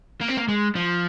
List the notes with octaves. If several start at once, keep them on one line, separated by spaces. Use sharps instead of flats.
A#3
C4
A#3
G#3
F3